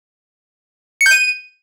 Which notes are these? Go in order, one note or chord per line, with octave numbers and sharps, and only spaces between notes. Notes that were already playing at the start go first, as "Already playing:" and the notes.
C#7
G6
D#7